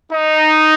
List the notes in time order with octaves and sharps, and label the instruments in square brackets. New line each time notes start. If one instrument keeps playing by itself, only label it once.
[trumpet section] D#4